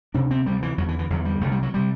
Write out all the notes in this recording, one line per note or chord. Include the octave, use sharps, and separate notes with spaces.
D2 C3 D4
C4
D2 C3 G3
E3
E2 D3 F#3
E3
E3
E2 D3 F#3
G3
C2 C3 A3
G3
F#3
C3 G3